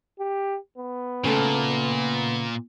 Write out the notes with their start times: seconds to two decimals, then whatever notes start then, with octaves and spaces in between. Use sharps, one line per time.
0.19 G4
0.78 B3
1.24 A#2 C#3 A3 A4